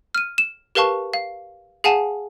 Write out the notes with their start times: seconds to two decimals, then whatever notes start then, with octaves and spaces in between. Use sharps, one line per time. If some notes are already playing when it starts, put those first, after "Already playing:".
0.15 F6 D#7
0.38 E7
0.75 G4 A#4 B4 F5 A5 C#6
1.13 F5
1.84 G#4 F5 F#5 G#5 A5